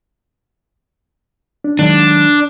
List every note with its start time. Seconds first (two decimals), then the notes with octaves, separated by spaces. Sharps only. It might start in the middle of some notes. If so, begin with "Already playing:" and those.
1.64 D4
1.79 D#3 F#3 G#3 D4